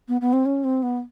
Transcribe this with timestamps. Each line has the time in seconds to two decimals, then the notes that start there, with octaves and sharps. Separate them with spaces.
0.08 B3
0.21 B3
0.33 C4
0.45 C#4
0.64 C4
0.83 B3